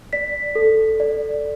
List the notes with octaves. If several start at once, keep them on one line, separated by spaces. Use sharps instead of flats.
D5 B6
A4
D5